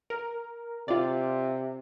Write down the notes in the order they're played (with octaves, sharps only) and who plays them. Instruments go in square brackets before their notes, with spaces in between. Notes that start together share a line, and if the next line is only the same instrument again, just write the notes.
[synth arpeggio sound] A#4
[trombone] C3 [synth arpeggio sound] F4 D5